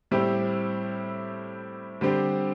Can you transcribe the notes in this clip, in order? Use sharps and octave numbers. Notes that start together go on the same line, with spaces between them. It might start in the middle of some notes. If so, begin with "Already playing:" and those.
A2 G3 C4 E4 G4
D3 G3 C4 G4